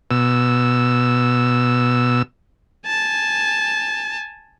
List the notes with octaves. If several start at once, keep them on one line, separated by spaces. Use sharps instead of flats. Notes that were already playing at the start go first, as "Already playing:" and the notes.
B2 E6
G#5 A5